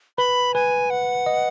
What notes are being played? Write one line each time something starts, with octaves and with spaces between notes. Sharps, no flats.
B4 B5
B4 G#5
F#5
D#5